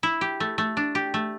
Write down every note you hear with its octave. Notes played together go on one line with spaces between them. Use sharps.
E4
G4
A3
A3
D4
G4
A3